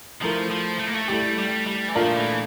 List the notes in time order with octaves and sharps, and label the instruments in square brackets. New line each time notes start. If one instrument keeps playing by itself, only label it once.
[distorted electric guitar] F3 [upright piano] A3 E4 A#4
[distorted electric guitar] F3
A3
A#3
A3
[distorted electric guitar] G3 [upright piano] A3 E4 G4
[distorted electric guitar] G3
G3
E3
[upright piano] A#2 A3 D4 F4 A#4 [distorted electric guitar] F3
[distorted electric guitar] E3